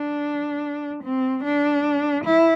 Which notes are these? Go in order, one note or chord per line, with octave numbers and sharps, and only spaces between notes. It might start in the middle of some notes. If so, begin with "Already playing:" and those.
Already playing: D4
C4
D4
E4